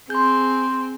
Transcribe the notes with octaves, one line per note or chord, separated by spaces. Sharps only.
C4 G#4 C6 G6